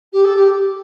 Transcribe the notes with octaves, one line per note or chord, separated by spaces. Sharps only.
G4
A4
G4